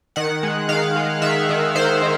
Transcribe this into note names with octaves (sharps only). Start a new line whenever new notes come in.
D#3 F#5
G#3
D#3 F5
G#3
D#3 E5
D#3
D#3 C5
D#3